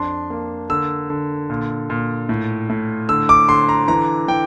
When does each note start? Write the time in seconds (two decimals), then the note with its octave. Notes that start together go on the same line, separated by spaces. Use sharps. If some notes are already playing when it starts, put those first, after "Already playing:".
Already playing: F2 D4 C6
0.30 A#3
0.70 D3 E6
1.10 D3
1.50 A#2
1.90 A#2
2.29 A2
2.69 A2
3.09 D3 E6
3.29 D6
3.49 D3 C6
3.69 A#5
3.88 E3 A#5
4.28 E3 G5